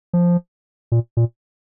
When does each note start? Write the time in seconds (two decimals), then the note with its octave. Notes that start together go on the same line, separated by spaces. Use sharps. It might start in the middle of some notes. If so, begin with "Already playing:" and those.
0.13 F3
0.92 A#2
1.17 A#2